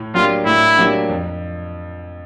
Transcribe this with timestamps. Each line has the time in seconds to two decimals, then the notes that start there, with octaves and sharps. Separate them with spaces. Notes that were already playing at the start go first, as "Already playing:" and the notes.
Already playing: A2
0.14 F#3 A#3 D4 F4 G4
0.46 A2 E4
0.77 F#3 A#3 D4 G4
1.09 F2